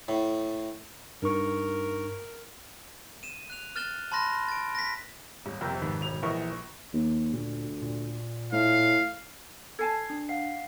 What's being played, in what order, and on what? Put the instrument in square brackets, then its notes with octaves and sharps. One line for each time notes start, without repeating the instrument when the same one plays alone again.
[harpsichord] A2
[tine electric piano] G2 D#4 C#6 [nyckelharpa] A#4
[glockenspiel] D#7 E7
F#6 F7
F6 F#6 A6 E7 G7
A5 B5 C6 F#6 A#6
A6 D7
A#6 B6
[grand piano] D#1
[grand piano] F2 C3 [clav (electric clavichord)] C4 A#4 G5
[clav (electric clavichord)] G#1 D#3 B4
[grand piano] E1 F7
[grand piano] A#1 A#4 C#6 [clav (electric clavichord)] E3 D#5
[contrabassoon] D#2
[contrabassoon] D2 [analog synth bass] A#2
[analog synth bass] A#2
[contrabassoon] A2 [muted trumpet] F5
[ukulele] A4 G#5 A5 [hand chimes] G#6 C7
[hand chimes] D4
F5 F#5 C7